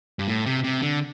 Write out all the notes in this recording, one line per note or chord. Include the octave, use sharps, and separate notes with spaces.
G2
A2
C3
C3
D3